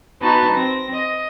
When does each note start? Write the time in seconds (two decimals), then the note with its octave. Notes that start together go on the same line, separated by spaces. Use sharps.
0.21 B3 D#4 F#4 B4 A5
0.53 C4 A#6
0.94 D#5